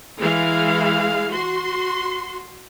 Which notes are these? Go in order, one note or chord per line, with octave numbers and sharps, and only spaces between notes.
E3 G#3 F5
F#4 C6